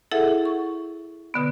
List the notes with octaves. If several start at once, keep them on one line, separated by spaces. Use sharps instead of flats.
E4 G#4 A4 E5 F#5
C#6
B2 D3 B3